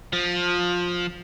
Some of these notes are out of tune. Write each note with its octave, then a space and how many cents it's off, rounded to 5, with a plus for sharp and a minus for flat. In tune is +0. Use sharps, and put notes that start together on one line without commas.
F3 +15